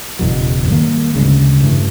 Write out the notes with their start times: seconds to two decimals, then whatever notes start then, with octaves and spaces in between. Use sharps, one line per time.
0.19 F#1 E2 B2 F#3
0.67 G#2 D#3 G3 A#3
1.15 D2 C#3 E3 G#3
1.63 G2 E3 A3